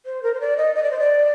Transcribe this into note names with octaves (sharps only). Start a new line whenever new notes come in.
C5
A#4
C5
D5
D#5
D#5
D5
C5
D5